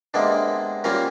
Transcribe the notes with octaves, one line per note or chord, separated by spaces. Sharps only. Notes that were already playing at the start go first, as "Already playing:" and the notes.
C3 G#3 A#3 B3 D4
G3 A#3 C4 C#4 F4 A#4